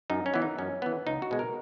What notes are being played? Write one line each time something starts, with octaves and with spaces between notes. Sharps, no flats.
F#2 D#4
C#4
E3 B3
D#4
F#2 C#4
E3 B3
C#2 D#4
F#4
B2 G#3
A#4